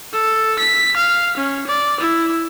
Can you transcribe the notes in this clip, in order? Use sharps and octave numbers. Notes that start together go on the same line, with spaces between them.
A4
B6
F5
C#4
D5
E4